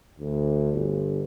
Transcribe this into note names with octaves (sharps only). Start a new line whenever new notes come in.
D2
G1